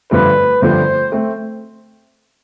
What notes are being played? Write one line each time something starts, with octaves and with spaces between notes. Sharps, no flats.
G2 D3 F3 A3 C4 B4
G2 D3 F3 A3 C4 C5
A3 C4